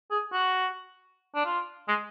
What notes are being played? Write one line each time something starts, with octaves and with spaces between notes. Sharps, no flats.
G#4
F#4
D4
F4
G#3